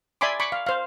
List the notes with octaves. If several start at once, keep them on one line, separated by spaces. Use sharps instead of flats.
D5 E5 G#5 B5 C6 D6
B5 C#6 D6
F5
C5 F5